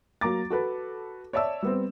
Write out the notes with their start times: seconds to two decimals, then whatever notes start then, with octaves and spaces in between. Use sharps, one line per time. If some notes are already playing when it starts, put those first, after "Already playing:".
0.21 F#3 A#3 A#5 D6 A6
0.50 F#4 A4 B4
1.33 C#5 D5 E5 A5 E6
1.63 G3 B3 C4